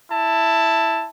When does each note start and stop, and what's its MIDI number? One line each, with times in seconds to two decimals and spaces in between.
0.11 1.08 64
0.11 1.08 81